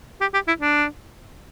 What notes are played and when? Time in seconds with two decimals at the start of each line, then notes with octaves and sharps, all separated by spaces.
0.21 G4
0.34 G4
0.48 E4
0.61 D4